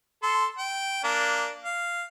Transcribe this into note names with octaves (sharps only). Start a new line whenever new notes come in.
A4 C6
G5
A#3 D4
F5